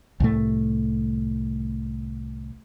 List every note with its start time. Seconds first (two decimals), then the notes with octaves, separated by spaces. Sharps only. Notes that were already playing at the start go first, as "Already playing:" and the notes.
0.20 C2 A2 A3